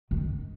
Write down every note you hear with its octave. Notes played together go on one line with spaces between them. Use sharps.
D#3